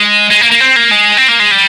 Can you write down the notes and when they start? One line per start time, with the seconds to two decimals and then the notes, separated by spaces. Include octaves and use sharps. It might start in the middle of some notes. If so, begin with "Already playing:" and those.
Already playing: G#3
0.31 G#3
0.41 A#3
0.51 A#3
0.61 C4
0.76 A#3
0.91 G#3
1.17 C4
1.28 A#3
1.40 G#3
1.51 G3